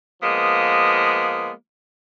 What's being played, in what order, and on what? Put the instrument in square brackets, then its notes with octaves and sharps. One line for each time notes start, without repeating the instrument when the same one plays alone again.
[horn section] F3 G#3 A#3 B3